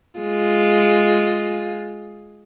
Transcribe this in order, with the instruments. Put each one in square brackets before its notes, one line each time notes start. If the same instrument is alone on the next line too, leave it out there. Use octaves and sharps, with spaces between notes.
[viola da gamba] G#3 F4